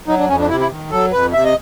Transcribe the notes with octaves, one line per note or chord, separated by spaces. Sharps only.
F#3 D#4
D4
F2 C#4
D4
C3 E4
E4
D#3
F#3 A4
F2 B4
C3 E5
D#5